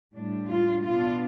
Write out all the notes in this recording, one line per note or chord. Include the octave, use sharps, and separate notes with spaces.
A2 G3 D4
F4
B2 B3 D4 F4